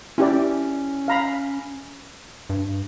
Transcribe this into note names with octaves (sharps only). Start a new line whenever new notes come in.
C#4 E4 G4 D5
F5 A#5 B5
G2